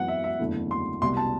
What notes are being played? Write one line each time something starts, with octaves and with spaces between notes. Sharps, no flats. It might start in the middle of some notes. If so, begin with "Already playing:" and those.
Already playing: F#2 E3 B3 F#5
E5
E5
F#1 E2 D3 A3 E4
C6
C2 B2 G3 C6
A5